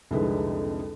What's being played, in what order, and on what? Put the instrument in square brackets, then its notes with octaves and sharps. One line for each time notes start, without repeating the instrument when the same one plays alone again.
[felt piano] C2 F2 D3 G#3 D#4 B4